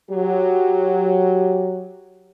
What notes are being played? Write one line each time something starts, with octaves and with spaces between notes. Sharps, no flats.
F#3 G4